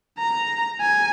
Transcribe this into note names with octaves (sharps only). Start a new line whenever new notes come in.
A#5
G#5